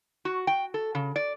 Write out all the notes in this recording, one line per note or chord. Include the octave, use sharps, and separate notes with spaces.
F#4
G5
A4
C#3
D5